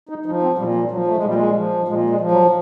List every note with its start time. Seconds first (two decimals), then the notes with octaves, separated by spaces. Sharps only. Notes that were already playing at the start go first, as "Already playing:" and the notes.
0.09 D#4
0.26 F3 D#4
0.42 C4
0.58 A#2 G3
0.75 F3
0.91 F3 F#3
1.07 A3
1.16 G#3
1.24 A#2 G3
1.35 G#3
1.56 F3
1.88 A#2 G#3
2.10 G#3
2.21 F3
2.31 F#3